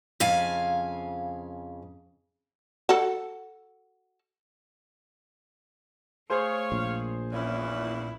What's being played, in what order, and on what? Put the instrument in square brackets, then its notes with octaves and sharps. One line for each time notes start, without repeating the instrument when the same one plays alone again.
[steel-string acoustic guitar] F2 C#3 F5 G#5
[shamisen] F#4 A4
[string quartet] A3 [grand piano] G#4 C5 C6 [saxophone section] C#5 F5
[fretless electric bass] A#1
[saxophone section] E2 A#2 C#4 [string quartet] E4